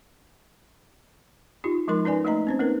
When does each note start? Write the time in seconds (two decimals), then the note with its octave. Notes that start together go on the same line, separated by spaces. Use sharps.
1.64 D#4 F4 G4
1.88 F3 G#3 D#4 A#4 C6
2.04 C#4 D#4 B4 D5 G#5
2.25 A3 A#3 D#4 D#5 A#5
2.47 C4 C#4 C5
2.59 A#3 C#4 D#4 A#4 B4